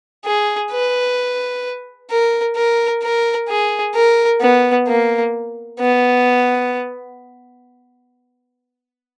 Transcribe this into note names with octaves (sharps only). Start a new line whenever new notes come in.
G#4
B4
A#4
A#4
A#4
G#4
A#4
B3
A#3
B3